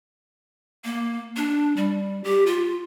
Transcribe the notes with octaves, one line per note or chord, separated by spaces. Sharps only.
A#3
D4
G3
G4
F4